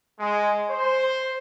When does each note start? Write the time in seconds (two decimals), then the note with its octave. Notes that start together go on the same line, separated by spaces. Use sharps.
0.19 G#3
0.69 C5